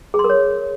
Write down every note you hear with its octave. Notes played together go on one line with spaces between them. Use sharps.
G#4
C6
A#4
C#5